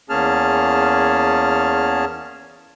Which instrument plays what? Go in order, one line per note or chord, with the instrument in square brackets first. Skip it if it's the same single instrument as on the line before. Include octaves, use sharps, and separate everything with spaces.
[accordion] E2 A#3 C#4 G#4 A5 F6